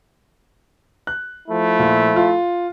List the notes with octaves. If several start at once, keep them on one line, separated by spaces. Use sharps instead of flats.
F#6
F3 A3 E4
A#2
F4